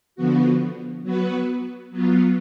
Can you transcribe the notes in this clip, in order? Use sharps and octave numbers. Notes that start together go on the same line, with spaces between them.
D3 F3 B3 F#4
F#3 B3 F#4 B4
F#3 B3 F4